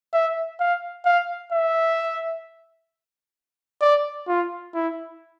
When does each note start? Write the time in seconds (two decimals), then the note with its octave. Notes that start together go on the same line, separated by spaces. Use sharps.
0.13 E5
0.60 F5
1.05 F5
1.53 E5
3.81 D5
4.28 F4
4.75 E4